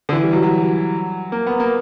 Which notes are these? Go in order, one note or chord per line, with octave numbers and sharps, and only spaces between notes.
D3
E3
G3
F#3
F#3
A#3
B3
A#3